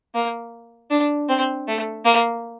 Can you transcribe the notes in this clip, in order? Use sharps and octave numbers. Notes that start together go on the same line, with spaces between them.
A#3
D4
C4
A3
A#3